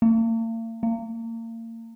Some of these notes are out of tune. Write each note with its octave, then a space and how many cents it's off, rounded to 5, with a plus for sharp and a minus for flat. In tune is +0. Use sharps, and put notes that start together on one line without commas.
A#3 -45
A#3 -35